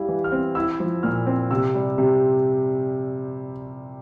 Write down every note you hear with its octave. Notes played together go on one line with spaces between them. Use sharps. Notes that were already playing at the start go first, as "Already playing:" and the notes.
Already playing: G3 E4 F5
E3
F6
C4
E4 E6
F3
A#2 F6
C4
C3 E6
G3
C3